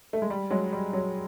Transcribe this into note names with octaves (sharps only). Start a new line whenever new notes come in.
A3
G#3
G3
F#3 G#3
G3
F#3